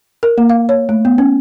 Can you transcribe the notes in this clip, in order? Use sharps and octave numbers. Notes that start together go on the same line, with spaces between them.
A#4
A#3
F5
C#5
A3
B3
C#4